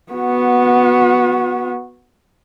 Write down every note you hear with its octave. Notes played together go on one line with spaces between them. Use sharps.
B3 F#4